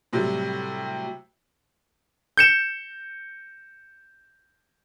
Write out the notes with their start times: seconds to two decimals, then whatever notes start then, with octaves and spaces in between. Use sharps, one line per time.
0.13 A2 C3 F#3 G3
2.37 G6 C#7 E7